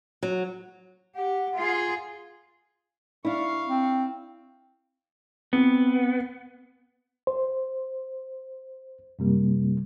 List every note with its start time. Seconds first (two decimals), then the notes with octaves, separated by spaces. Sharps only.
0.23 F#3
1.15 G4 F#5
1.56 F4 G#4
3.25 D4 E4 F5 C#6
3.68 C4
5.53 B3 C4
7.27 C5
9.19 F#2 C3 G3 A#3